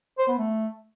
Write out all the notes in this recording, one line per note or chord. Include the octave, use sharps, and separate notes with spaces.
C5
B3
A3